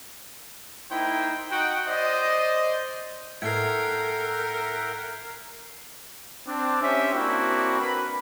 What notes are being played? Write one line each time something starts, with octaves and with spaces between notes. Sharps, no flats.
A#3 D#4 E4 C5 G5
D#4 F#4 F#5 G5
C5 D5 D#5
A2 A4 A#4 E5 F#5 G5 G#6 C7
C4 D4
C4 C#4 D#4 G4 E5
A#3 C4 D4 E4 F#4
A#4 B4 B5